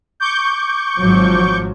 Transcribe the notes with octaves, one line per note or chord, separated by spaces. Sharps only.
C#6 D6 G6
G#1 F3 F#3